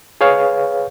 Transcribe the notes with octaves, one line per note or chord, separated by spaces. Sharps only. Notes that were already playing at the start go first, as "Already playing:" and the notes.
G#4 B4 C#5 F5